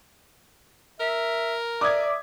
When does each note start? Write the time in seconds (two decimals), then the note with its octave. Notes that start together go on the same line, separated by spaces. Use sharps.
1.00 A#4 E5
1.81 D5 E5 D6 D#6 G#6